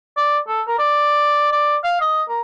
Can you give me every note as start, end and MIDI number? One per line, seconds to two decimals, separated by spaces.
0.17 0.38 74
0.48 0.62 69
0.68 0.76 70
0.79 1.49 74
1.52 1.76 74
1.84 1.99 77
2.01 2.23 75
2.29 2.41 70